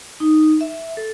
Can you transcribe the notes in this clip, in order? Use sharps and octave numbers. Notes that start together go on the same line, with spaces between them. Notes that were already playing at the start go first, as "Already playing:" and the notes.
D#4
E5
A4